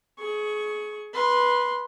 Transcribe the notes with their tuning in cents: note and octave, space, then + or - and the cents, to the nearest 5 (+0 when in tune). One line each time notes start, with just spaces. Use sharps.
G#4 +30 C#6 +0
B4 -15 C6 +0